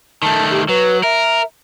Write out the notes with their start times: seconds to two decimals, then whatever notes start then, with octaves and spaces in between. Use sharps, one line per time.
0.23 D#3 A3 A5
0.51 G4
0.69 F#3 B4
1.03 A#4 E5